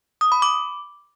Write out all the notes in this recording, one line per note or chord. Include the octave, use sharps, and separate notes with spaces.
D#6
B5
D6